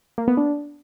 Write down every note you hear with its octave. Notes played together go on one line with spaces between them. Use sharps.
A#3
B3
D4